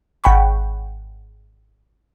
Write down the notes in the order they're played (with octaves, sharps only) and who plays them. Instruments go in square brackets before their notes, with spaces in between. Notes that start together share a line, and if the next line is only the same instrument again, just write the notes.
[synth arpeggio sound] G#1 F#5 G5 B5 C#6